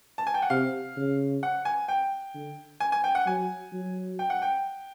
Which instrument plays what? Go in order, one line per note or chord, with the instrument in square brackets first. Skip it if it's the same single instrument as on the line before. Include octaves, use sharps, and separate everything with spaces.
[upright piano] A5
G#5
G5
F#5
[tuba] C3 [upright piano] F5
[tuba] C#3
[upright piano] F#5
G#5
G5
[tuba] D3
[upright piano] G#5
G#5
G5
F#5
[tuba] F#3 [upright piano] G#5
[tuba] F#3
[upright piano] G5
F#5
G5